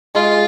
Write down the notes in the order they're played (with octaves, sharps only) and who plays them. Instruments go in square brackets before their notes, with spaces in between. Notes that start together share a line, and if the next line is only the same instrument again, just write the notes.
[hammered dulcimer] G#3 [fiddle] F4